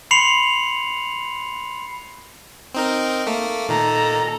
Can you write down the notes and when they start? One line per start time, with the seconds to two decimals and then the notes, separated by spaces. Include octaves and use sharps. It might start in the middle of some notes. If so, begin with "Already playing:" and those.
0.11 B5 C6 C7 C#7 F7 F#7
2.75 C4 D#4 A#4
3.27 A3 A#3
3.69 A#2 D#3 A4 A#5